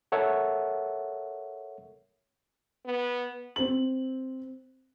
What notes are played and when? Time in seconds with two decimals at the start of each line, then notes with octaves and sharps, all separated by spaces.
0.12 A4 A#4 C#5 E5 F#5
2.86 B3
3.56 C4 F#7